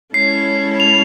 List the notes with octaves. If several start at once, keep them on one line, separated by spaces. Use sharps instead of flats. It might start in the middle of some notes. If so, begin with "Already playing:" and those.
G#3 C#4 E4 A4 C#5 C7
F7